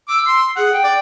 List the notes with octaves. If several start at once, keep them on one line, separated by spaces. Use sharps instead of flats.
D6 E6
C6
G#4 F#5
G5
D5